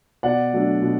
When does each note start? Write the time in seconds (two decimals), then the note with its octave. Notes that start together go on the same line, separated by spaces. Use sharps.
0.23 B2 D5 F#5
0.53 F#3 A3 D4
0.82 B2